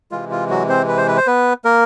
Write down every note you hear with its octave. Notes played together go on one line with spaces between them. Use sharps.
C3 E3 G#3 F4
F4
F#3 F#4
C4 C5
B4
C5
B4
C5
B3 B4
A#3 A#4